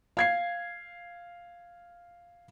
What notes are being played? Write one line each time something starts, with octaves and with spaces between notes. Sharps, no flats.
F5 G#6 C7